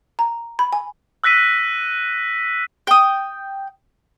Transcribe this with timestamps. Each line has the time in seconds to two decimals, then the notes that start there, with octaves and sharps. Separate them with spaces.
0.19 A#5
0.59 B5
0.73 G#5
1.24 E6 F#6 A#6 B6 D#7
2.87 G5 D#6